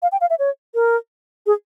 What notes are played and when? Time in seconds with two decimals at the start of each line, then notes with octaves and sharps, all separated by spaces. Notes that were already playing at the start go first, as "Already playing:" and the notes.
0.02 F5
0.12 G5
0.21 F5
0.30 E5
0.39 C#5
0.75 A#4
1.46 G#4